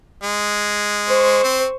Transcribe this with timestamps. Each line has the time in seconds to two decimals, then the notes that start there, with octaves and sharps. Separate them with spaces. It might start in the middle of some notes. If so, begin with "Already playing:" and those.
0.23 G#3
1.07 C5 C#6
1.44 C4